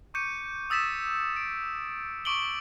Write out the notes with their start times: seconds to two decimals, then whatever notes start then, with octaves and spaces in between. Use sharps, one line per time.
0.14 C#6 D6 G6 C#7 D#7
0.70 D#6 E6 A6 B6 E7
1.36 D7
2.25 C#6 D6 D7 F#7 G7